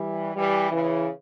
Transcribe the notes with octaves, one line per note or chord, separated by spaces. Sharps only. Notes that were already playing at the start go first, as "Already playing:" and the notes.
Already playing: E3 G3
E3 G3
C#3 E3